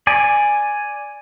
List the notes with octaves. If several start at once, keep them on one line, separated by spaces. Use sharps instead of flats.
D5 G#5